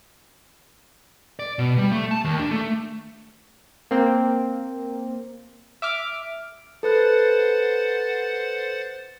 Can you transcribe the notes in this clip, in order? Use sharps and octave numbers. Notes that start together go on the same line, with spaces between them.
D5
B2
G3
A3
A5
D#2
D4
A3
A#3 C4
E5 D6 F6
A4 B4 C5 F#5 F#6 A6